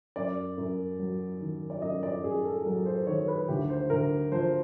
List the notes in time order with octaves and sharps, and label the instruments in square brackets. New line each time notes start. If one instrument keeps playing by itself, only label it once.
[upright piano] F#2 D5
F#2
F#3
D#3
D5
F#2 D#5
D5
F#2 G#4
A4
F#3 A#4
C5
D#3 C#5
B4
D2 G4
C5
D2 A#4
F3 C5